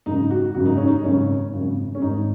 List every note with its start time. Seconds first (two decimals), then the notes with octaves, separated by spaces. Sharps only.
0.06 G#1 F#2 C#3 D#4
0.30 F#4
0.55 G#1 F#2 C#3 F#4
0.66 D#4
0.77 C#4
0.88 D#4
1.04 G#1 F#2 C#3 C#4
1.53 G#1 F#2 C#3
1.95 C#4
2.02 G#1 G#2 D#3 D#4